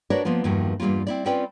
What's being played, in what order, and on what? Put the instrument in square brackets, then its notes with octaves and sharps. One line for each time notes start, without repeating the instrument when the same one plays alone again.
[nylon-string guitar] D4 F#4 A#4 B4 C#5 D5
F3 A#3 B3 F4
E2 G2 D#3 F3 A#3 F#4
E2 G2 G3 A#3 F4
C4 E4 D5
C4 C#4 F4 B4 D5 G5